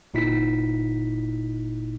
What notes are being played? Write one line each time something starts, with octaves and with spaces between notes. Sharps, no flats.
G1 A#2 D#4 E4 B6